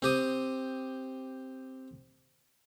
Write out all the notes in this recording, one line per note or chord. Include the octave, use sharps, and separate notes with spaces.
C4 G4 D#6